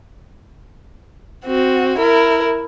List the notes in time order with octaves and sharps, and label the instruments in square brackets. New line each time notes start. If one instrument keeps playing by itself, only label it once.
[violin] C4 F#4
E4 A#4